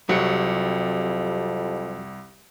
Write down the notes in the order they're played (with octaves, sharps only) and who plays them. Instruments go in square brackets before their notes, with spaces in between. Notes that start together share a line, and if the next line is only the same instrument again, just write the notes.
[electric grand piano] C2 G3 C#7 [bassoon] F2 [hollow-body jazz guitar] F#3